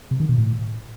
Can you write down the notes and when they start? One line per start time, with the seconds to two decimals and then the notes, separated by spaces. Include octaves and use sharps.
0.11 C3
0.20 D#3
0.29 B2
0.38 A2